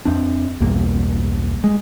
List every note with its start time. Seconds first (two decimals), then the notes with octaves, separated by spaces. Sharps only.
0.05 F2 C4 D4
0.60 B1 E2 G2 A#3
1.64 G#3